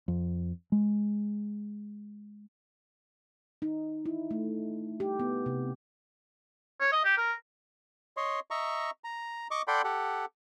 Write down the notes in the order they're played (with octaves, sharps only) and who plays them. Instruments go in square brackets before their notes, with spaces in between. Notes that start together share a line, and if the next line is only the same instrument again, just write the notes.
[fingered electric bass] F2
G#3
[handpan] D#4
E4
A3
G4
B3
C3
[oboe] C#5
D#5
G4
A#4
[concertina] C#5 D#5 C6
D#5 E5 A#5 C#6
A#5
D#5 C#6 D6
A4 D5 F#5 G5 B5 C6
G4 A4 F#5